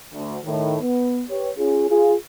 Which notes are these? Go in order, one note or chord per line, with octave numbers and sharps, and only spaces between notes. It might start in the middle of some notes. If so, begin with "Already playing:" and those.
D2
A2 D#3
B3
G4 B4 C#5
C#4 F4 G#4
F4 G#4